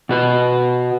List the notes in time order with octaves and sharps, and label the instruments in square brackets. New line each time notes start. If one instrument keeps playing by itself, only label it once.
[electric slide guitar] B2 F#4 B4